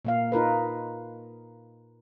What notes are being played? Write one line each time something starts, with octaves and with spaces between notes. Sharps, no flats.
A#2 A#3 F5
D#4 F4 A#4 B4